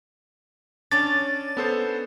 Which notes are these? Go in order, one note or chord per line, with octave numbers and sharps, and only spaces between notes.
C#4 D4 A6
B3 A4 C5